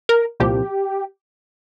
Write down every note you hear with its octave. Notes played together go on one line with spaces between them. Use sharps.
A#4
C2 A#2 F3 G4